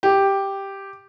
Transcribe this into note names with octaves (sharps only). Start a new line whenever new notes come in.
G4